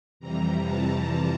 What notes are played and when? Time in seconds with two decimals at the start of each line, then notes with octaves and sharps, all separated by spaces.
0.20 F2 C3 E3 G3 A#5
0.64 A5